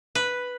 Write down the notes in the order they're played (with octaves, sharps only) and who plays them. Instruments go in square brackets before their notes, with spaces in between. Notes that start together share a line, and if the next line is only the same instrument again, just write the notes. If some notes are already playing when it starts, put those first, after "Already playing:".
[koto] B4